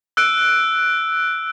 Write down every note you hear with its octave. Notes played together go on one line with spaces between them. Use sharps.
E6 F#6 D7